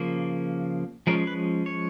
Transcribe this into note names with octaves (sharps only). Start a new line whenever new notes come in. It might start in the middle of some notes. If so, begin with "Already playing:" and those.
Already playing: C#3 F3 A#3
F3 G#3 C#4 A#4
B4
C#5